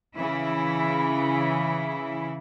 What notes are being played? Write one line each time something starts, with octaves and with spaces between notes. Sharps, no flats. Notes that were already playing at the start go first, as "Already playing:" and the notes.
C#3 E3 E4